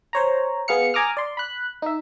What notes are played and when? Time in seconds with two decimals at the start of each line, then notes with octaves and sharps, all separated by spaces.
0.13 C5 C#5 A#5
0.68 B3 G#4 F5 F6 C#7
0.94 G#5 A#5 D6 D#6 F6
1.17 D5 C6
1.37 B5 F#6
1.82 D#4 E5